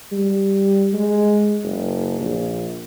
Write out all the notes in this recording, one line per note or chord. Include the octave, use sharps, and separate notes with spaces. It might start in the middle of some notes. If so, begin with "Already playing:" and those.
G3
G#3
F#1
A#1